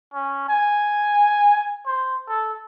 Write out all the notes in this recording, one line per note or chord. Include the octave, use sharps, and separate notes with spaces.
C#4
G#5
C5
A4